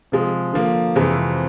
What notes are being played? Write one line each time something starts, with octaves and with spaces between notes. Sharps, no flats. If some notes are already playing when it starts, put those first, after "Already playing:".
C3 F3 G#3
D3 F3 A#3
F2 C3 E3 G#3